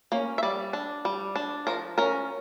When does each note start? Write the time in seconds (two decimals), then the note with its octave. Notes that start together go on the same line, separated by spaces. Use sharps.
0.12 A#3 C#4
0.38 E5
0.43 G3 D5
0.73 D4
1.05 G3
1.36 D4
1.67 F3 A#4
1.98 C#4 A#4